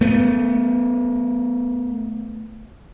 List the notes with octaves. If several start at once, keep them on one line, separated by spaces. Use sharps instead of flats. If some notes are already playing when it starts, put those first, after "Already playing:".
A3 B3